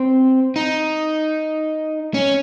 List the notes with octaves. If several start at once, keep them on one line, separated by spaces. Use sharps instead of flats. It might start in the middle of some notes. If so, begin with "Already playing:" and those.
Already playing: C4
D#4
C#4